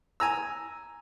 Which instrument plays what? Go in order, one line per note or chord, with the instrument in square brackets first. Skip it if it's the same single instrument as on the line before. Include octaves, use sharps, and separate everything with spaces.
[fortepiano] G#5 A#5 E6